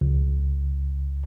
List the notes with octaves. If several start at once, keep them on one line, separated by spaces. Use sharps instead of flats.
C#2